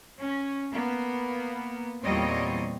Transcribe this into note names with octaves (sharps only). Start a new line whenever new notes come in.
C#4
A#3 B3
E2 A#2 G3 C4 C#5 D#5